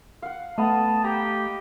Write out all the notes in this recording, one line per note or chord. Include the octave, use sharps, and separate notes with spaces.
F5 F#5
A3 B3 D#5 A5
G4 A#5